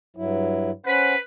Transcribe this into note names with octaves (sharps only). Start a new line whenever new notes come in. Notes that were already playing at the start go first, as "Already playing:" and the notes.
G2 F#3 E4
C#4 B4 C5 F#5